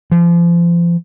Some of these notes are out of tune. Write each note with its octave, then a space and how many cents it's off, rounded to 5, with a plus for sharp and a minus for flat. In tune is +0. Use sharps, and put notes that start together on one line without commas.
F3 -35